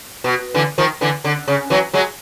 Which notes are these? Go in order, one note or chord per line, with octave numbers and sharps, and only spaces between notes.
B2
D3 E3
D#3 F3
D3 E3
D3
C#3
E3 F#3
F#3 G#3